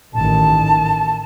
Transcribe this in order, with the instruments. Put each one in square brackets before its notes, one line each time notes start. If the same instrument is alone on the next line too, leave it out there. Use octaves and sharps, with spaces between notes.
[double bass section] A1 D#3 [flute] A5